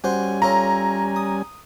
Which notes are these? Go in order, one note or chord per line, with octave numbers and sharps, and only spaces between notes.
G3 C#4 F#4 C5 G#5
F4 A4 C#5 A#5
D#6